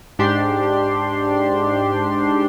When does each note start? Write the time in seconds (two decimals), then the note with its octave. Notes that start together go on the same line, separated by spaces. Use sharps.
0.19 G#2 D4 G4 C6